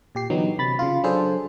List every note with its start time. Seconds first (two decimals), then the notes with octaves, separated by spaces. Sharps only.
0.15 A#2 G4 C7
0.30 D3 E3 F#3 B3 D#4
0.58 C3 B5 A6
0.79 C#3 F4
1.04 F#3 D4 G#4 A4 C5